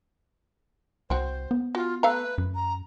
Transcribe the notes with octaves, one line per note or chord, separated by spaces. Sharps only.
C2 C4 F#4 C5
B3
F4 F#4
A3 B4 F5 A#5
F#2
A#5